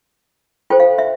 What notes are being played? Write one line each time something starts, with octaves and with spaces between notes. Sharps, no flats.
F4 A4 C5 G5
F5
E5